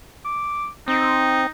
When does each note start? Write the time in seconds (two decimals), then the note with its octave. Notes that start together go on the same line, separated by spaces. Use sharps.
0.25 D6
0.88 C4 D#4